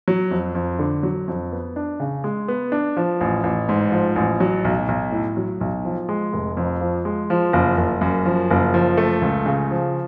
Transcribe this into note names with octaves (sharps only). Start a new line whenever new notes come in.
F#3
F2
F2
D3
F#3
F2
B3
D4
C#3
G#3
B3
D4
F3
A1
A1
G#2
F3
A1
F#3
B1
B1
A2
F#3
B1
F3
G#3
F1
F2
F3
G#3
F3
F#1
F#1
F#2
F3
F#1
F3
A3
C#2
C#3
F3